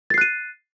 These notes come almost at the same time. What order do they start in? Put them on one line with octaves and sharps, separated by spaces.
A6 C7 F#6 D#7